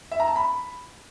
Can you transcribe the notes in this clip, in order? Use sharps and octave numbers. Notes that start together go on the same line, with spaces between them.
E5
A#5
A5
B5